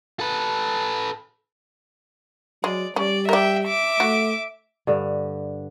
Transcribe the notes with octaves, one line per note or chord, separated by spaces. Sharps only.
A4 B4
F#3 G#3 D5
G3 C#4 D5
A#4 D5 E5 G5
E5 D6
A3 F#4
G2 D3